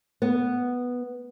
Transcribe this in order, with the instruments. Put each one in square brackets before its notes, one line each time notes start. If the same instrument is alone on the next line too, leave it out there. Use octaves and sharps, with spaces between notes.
[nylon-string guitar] B3